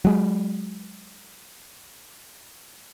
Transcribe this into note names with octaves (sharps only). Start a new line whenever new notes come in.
F#3 G#3